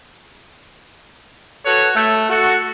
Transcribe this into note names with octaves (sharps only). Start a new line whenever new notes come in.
F#4 A4 B4 C#5
A3
F#4 A4